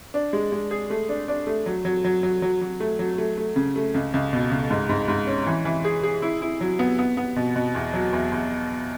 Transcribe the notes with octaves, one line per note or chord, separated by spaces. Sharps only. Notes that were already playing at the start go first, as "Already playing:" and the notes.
D4
G#3
G#3
G#4
A3
D4
D4
A3
F#3
F#3
F#3
F#3
F#3
F#3
A3
F#3
A3
A3
C#3
A3
C#2
C#2
B2
C#2
G#2
G#2
G#2
C#4
E3
E3
G#4
G#4
E4
E4
F#3
B3
B3
B3
B2
B2
E2
F#3
E2
E2